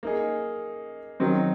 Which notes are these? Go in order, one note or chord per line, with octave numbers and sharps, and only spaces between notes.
A#3 D#4 G#4
D#3 F#3 C4